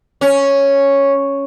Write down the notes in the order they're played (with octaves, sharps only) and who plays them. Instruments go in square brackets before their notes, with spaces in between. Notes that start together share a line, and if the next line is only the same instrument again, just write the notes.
[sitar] C#4